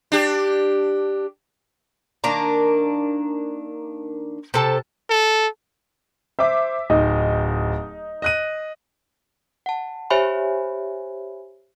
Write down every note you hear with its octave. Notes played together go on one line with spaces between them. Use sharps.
D4 G4
D#3 A#3 D4 A#5
C3 A4 A5
A4
C5 E5 D6
D1 D#4
D#5 F#6 D#7
F#5 A5
G4 C5 C#5 E5 G#5 B5